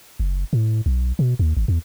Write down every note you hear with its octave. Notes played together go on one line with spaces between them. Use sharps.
F#1
A2
B1
B2
D#2
G#1
E2